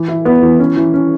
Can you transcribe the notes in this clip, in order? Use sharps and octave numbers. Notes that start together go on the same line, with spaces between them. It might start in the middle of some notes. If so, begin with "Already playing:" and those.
Already playing: E3
E4
B3 E4
E3
C#4
E3
C#4